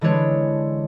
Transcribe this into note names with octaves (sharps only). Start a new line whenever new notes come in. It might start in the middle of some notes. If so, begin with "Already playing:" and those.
D3 E3 G#3 D4 C#5